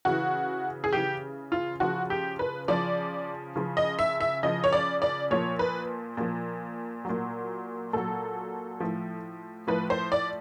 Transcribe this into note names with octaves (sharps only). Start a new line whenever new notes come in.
C#3 E3 F#4
G#4
C#3 E3 G4
F4
C#3 F3 F#4
G4
B4
C#3 F3 D5
C#3 F3
D#5
E5
E5
C#3 F3 D#5
C#5
D5
D5
A#2 F3 C#5
B4
A#2 F3
A#2 F#3
A#2 F#3 A4
A2 F3
A2 F3 B4
C5
D5